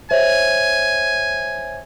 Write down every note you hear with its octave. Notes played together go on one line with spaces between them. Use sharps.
C5 C#5 E5 G#5